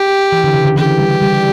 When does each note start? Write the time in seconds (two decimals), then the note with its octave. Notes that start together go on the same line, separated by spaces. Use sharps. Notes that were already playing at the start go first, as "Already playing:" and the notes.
Already playing: G4
0.32 E3
0.44 D3
0.54 C#3
0.65 D3
0.77 E3 G4
0.98 G3
1.22 G3